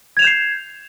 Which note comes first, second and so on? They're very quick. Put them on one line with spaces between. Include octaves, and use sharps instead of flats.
G#6 F7 E7 G6 C7